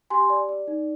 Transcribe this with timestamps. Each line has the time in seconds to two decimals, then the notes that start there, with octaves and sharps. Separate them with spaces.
0.10 G4 G#5 C6
0.30 D5
0.49 D5
0.68 D#4